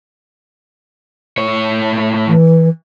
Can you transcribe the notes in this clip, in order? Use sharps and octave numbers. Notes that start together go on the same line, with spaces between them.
A2 C#5
E3